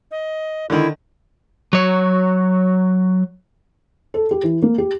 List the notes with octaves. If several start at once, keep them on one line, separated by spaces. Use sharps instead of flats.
D#5
D3 D#3 E4
F#3 C#5
A4
G4
E3
A#3
G4